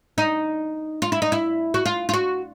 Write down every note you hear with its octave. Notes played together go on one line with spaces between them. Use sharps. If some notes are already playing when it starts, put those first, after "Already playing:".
D#4
F4
E4
D#4
E4
F#4
F4
F4
F#4